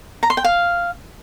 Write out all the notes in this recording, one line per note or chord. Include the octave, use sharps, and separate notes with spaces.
A#5
C6
G5
F5